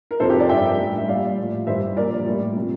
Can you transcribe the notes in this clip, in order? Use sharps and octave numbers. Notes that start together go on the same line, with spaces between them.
A#4
F2 C3 F3 A4 C5
G4 A#4
A#4 D5
G2 F3 E5 G5
A2 G3
E5
A#2 G3 D5 F5
A2 F3
G2 E3 G3 C5 E5
A#2 F3 A#4 D5
A2 G3
C3 F3